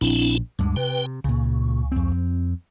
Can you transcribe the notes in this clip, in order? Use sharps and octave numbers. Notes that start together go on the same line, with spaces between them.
A#1 C4 D4 E4
D2 G2 G3 G#3
C3 B4 G5
C#2 A#2 C#3
F2 C4